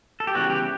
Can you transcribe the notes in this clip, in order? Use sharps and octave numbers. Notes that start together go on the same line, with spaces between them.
A4
G4
C#3 E3 G3 B3 F#4
G4